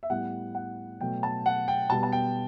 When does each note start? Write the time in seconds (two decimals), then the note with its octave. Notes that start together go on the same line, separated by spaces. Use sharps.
0.03 E5
0.10 A2 G3 B3 F#5
0.55 F#5
1.01 B2 F#3 A3 G5
1.23 A5
1.46 F#5
1.68 G5
1.90 B2 G3 B3 A5
2.03 A5
2.12 G5